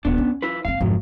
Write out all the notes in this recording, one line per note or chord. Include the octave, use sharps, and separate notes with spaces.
D#1 B3 D4
C#4
E4 F4 B4
F#1 C4 F5
G#1 F2 C3 F3 F#3